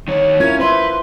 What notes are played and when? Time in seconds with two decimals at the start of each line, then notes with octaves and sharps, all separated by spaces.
0.08 D#3 C#5
0.40 C#4 E4 F4 A#4 G#6
0.60 B4 C5 E5 C6